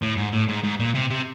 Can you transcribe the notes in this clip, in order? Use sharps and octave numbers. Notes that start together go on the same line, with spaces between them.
A2
G#2
A2
G#2
G#2
A#2
C3
C3